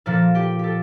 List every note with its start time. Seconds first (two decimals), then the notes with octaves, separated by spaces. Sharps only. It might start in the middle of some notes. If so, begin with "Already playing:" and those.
0.06 A#2 F3 A#3 A4
0.35 G4
0.59 G4 A4